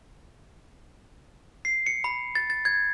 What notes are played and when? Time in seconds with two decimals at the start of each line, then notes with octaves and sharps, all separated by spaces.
1.65 C7
1.86 C#7
2.04 B5
2.35 A6
2.50 A6
2.65 G#6